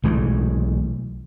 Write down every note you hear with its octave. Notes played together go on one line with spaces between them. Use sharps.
B1 E3 G#3 A3